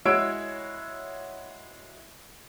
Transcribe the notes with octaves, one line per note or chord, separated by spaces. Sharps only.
G#3 E4 F#4 C#5 E6 D7